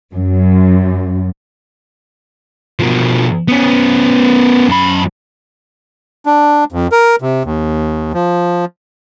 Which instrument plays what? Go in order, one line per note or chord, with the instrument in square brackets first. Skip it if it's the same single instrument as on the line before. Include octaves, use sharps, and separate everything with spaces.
[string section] F#2
[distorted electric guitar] B2 F3
B3 C#4
F#2 B5
[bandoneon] D4
F2
A#4
C3
D#2
F3